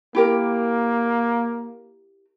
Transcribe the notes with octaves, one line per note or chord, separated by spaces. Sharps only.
A#3 E4 G4 A#4